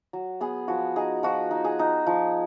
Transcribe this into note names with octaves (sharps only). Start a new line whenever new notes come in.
F#3
B3 G#4
F3 F#4
D#4 G#4
F3 F#4
D#4
G#4
D#4
F3